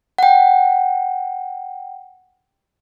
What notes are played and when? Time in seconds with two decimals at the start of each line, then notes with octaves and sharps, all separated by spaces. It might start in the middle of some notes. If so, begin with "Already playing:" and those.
0.18 F#5 G5